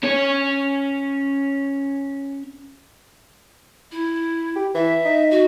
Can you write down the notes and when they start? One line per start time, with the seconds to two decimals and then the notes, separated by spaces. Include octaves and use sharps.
0.03 C#4 C#5
3.91 E4
4.56 G4
4.74 E3 E5
5.05 D#4
5.30 F#4